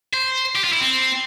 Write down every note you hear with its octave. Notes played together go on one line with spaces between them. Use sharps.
C5
G4
F4
E4
C4